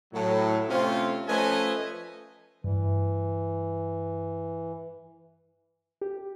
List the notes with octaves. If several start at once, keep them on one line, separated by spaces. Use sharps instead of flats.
A2 F#3
C3 A3 C4 C#4 F4
F3 A3 C#4 B4 D#5 G#5
G2 E3
G4